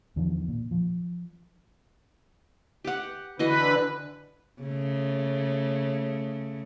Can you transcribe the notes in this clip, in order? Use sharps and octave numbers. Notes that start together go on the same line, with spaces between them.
E2 D3 D#3 F3
A#2
F3
G4 F#5
D3 E3 F#4 B4 D#5
C#3 A3